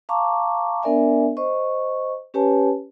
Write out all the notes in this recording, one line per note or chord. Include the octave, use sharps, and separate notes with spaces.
F5 A5 A#5 C#6 D6
B3 D4 A#4 D5 E5 G#5
C5 D#5 C#6
C#4 G4 B4 C#5 G#5 A5